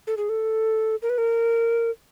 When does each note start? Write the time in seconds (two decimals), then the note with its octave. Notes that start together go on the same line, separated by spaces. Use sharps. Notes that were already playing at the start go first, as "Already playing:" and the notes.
0.07 A4
0.17 G#4
0.29 A4
1.02 A#4
1.10 B4
1.18 A#4